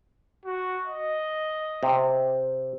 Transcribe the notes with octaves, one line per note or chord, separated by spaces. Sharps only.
F#4
D#5
C3